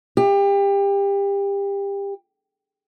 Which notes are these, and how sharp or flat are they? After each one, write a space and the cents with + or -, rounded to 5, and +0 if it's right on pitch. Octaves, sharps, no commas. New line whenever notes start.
G4 +25